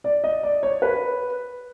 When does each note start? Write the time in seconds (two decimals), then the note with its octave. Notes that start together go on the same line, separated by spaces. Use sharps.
0.04 D5
0.24 D#5
0.43 D5
0.63 C#5
0.82 B4